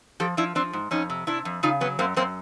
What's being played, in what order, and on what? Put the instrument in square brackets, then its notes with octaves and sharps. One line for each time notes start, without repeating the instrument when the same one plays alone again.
[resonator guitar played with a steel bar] F3 G4 A4
F3 D4 E4
F3 C4 D4
G#2
F2 C#4 D#4
C3
C3 D4 E4
F2
C#3 D#4 F4
F#3 B3 C#4
F#2 A#3 C4
F#2 A#3 C4